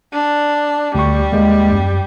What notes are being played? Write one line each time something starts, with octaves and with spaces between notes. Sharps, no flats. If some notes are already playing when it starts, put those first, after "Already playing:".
D4
D2 G3 C#6
D#2 G#3 A#3
F#2